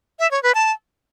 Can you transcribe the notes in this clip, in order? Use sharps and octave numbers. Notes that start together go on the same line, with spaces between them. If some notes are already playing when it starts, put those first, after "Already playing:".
E5
C#5
B4
A5